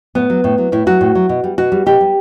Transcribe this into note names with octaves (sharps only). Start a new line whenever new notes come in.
A2 B3
F#3
A2
F#3
A2 E4
F#3 F#4
A2
F#3
B2
G3
B2 F#4
G3
B2 G4
G3